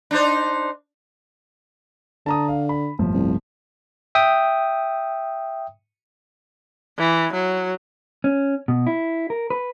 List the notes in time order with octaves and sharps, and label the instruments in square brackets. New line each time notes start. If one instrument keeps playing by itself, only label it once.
[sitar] D4 D#4 C5
[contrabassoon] D3 [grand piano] A5 A#5 D#6
[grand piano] F5
B5
G1 A2 F3
[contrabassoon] C2
[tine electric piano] E5 G5 D#6
[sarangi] E3
F#3
[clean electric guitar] C#4
B2
E4
A#4
B4